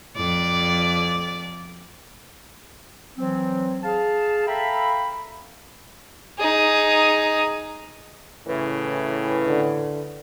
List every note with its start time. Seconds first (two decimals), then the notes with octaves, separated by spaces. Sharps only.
0.16 F2 D5
3.17 E3 F#3 C4
3.83 G#4 F5 A5
4.47 A4 E5 F5 G5 A#5 B5
6.39 D#4 G#4
8.47 A2 C#3 E3
9.47 D3